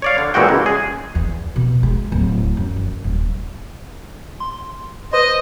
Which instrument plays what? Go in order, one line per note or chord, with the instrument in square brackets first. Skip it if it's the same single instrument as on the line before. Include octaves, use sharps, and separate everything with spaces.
[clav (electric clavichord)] C#5 D5 F5
D3
B1 A#2 E3 G#3 F#4 G5
C#2
G#4
[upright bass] E2
B2
G#3
D1
F#2
D#3
D#1
[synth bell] C6
[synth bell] B4 C5 C6 [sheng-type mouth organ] D#5